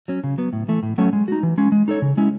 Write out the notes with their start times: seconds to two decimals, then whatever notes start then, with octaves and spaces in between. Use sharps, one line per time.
0.08 F#3 C#4
0.24 C#3
0.38 F#3 B3
0.53 A2
0.68 E3 A3
0.83 A2
0.98 F#3 A3 C#4
1.13 G#3
1.28 D#4 F#4
1.43 E3
1.58 G#3 C#4
1.72 G#3
1.88 D#4 A4 C#5
2.02 C#3
2.17 G#3 C#4 E4